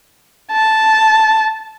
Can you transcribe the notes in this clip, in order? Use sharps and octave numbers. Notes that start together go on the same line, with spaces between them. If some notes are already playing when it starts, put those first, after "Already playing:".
A5